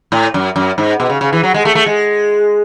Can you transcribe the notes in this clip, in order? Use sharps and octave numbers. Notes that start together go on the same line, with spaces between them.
A2
F#2
F#2
G#2
B2
C#3
C#3
E3
F#3
G#3
A3
A3
G#3